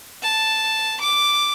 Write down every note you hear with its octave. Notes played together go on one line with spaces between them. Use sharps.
A5
D6